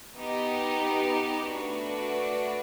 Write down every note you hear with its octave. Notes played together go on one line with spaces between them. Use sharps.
B3 D#4 G4
A3 D4 F#4 B4